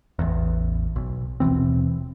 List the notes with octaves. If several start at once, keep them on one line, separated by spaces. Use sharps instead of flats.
A1 E2
B1
D#1 B2 E3 C4